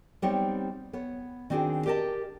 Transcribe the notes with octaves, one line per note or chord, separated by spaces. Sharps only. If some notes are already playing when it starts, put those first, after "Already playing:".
G3 B3 C4 D#4 C#5
B3 C#5
D#3 C4 D4 F#4 G#4
G4 A#4 D5 D#5 A5